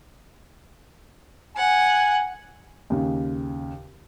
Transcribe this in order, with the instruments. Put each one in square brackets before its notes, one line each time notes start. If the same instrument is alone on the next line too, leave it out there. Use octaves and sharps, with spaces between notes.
[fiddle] F#5 [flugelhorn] G#5
[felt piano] D#2 C#3